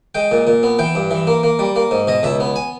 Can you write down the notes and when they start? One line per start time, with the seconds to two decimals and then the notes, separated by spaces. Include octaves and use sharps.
0.15 G#3 G5
0.31 A#2
0.47 A#2
0.63 B3
0.79 E3 G5
0.95 G2
1.11 E3
1.27 A#3
1.43 A#3
1.59 G3
1.76 A#3
1.91 G#2
2.08 B2 D#5
2.23 C#2 E5
2.40 B3
2.56 G#5